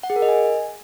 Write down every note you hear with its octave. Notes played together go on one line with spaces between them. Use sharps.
F#5
G#4
A#4
D#5
G#5